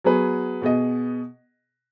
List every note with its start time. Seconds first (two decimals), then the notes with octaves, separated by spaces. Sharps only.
0.04 F#3 B3 G#4 B4
0.62 B2 B3 G#4 D#5